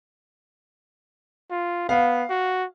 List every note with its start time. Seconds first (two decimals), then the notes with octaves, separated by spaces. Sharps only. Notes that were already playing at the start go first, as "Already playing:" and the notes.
1.51 F4
1.89 B3 F5
2.30 F#4